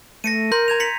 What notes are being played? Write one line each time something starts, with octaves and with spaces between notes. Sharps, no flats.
A3 A#6 C#7 D#7
A#4 C6 G6 A#6
A#5 G#6 F7
B6 C#7 F#7